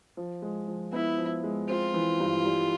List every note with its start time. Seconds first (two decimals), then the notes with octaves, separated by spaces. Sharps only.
0.17 F3
0.42 G#3
0.68 F3
0.93 B3 E4
1.18 F3
1.44 G#3
1.69 C4 F4
1.94 E3
2.20 G2
2.45 G3